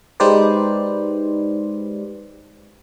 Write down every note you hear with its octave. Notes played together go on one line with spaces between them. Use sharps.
G#3 D#4 G4 B4 C5 D5